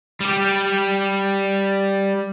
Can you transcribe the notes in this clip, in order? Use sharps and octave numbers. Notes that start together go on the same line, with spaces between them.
G3 G4